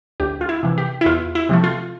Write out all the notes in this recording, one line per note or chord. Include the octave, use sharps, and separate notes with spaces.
D2 G4
F4
E4
C3 E3
G4
E4
E2 F4
E4
C3 F3 A3
F4